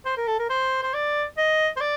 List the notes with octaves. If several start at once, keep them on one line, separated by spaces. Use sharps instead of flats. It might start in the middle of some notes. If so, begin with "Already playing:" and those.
C5
A#4
A4
A#4
C5
C5
D5
D#5
C5
D5